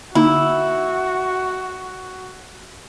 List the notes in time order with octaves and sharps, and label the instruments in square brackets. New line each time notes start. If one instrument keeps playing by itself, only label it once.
[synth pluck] D3 A#3 D#4 [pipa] E4 [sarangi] F#4